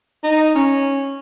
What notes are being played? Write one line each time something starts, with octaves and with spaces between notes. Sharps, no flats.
D#4
C#4